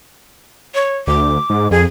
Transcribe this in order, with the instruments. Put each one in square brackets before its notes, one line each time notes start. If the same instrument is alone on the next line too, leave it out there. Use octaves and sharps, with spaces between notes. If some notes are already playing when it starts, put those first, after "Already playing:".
[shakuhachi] C#5
[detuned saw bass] D2 [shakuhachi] D6
[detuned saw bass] G#2
[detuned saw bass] F2 [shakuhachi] G#4